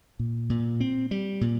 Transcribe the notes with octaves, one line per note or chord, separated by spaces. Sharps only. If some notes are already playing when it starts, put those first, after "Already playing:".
A#2
A#2
C4
G3
A#2